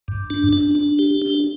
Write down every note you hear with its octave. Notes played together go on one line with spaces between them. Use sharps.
G2
D4
D4
D4
G4
D4